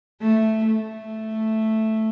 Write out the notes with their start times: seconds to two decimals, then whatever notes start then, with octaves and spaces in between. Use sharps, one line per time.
0.21 A3
0.66 A3